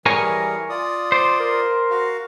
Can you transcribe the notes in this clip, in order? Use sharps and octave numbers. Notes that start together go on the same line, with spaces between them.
E3 G3 G#4 A#4 C#5 G#5
F4 D5 D#6
C5 D6
A#4
F#4 F5